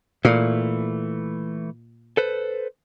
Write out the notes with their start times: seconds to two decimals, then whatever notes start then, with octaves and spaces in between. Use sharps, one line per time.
0.25 A#2 E3 A3
2.17 A4 B4 C5